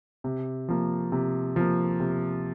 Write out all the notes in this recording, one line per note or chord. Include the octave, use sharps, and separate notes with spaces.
C3
F3 A#3
C3
F3 A#3
C3